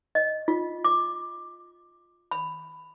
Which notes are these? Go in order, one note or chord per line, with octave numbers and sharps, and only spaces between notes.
D#5
F4
D6
B5